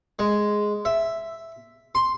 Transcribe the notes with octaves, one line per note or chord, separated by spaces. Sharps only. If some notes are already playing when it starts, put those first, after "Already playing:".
G#3
E5
C6